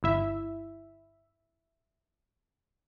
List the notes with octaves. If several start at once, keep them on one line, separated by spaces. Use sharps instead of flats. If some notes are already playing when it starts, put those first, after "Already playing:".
G1 E4 E5